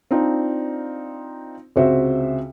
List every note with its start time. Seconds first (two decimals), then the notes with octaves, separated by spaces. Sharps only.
0.11 C4 D4 D#4 F4
1.76 C#2 C3 F#4 C5 E5